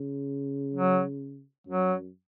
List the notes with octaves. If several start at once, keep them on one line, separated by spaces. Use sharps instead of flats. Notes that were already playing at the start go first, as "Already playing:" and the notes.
Already playing: C#3
F#3
F#2 F#3